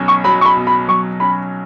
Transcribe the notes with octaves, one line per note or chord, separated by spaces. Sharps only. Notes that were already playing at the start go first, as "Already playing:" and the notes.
Already playing: B1 B2 F#3 C#4
C#6
F#3 B5
C#6
B5
B2
B5
B1 C#6
C#4 B5